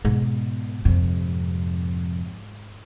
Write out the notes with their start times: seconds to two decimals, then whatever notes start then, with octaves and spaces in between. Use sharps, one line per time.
0.05 G#2 B2
0.85 F2 C3